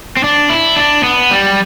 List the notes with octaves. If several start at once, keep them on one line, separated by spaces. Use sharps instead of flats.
C4
D4
E4
D4
B3
G3